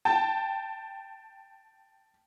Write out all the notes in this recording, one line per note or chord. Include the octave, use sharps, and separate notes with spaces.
G5 A5